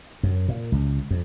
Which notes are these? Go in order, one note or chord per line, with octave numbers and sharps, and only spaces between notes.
F#2
A#2
C#2
F2